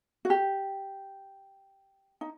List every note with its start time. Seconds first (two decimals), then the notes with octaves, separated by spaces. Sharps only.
0.25 F#4
0.30 G4
2.21 D#4